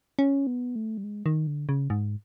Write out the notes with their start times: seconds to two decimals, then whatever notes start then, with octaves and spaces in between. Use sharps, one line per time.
0.19 C#4
0.47 B3
0.76 A3
0.97 G3
1.04 G#3
1.26 D#3
1.47 D3
1.69 C#3
1.90 G#2